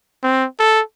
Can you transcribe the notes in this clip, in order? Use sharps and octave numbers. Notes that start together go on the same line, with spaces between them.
C4
A4